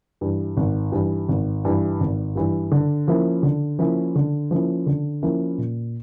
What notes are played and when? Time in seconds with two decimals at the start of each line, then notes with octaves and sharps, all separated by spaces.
0.21 G2 E3
0.57 G#1
0.92 G2 E3
1.28 G#1
1.65 G2 E3
2.00 G#1
2.36 G2 E3
2.71 D3
3.07 F3 A#3 C#4 E4
3.43 D3
3.79 F3 A#3 C#4 E4
4.15 D3
4.51 F3 A#3 C#4 E4
4.86 D3
5.22 F3 A#3 C#4 E4
5.58 A#2